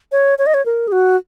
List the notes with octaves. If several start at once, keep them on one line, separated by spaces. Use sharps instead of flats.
C#5
C#5
D#5
C#5
A#4
G#4
F#4